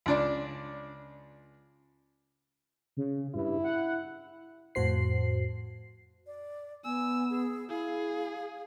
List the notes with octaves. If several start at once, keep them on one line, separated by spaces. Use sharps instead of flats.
C#2 D4 D5
C#3
G2 E4
F#5
F2 A2 F#4 C5 C7
D5
B3 G#5 E6
G#4
E4 G#4 F5